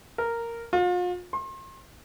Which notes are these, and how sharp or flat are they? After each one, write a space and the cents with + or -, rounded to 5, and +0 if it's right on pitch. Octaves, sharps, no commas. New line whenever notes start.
A#4 -5
F4 +40
C6 +40